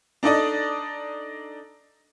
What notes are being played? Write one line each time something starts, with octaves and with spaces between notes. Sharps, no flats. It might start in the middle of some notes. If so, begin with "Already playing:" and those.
D4 D#4 A4 D5 D#5